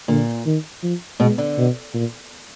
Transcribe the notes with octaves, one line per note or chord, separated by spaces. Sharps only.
A#2 D3
D#3
F3
B2 G#3
D3
B2
A#2